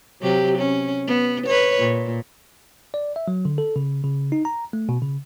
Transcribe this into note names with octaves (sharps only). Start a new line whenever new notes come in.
C3 F#3 G4
C#4
B3
B4 C#5
A#2
D5
E5
F#3
D3
A4
C#3
C#3
D#4
A#5
A3
B2
C#3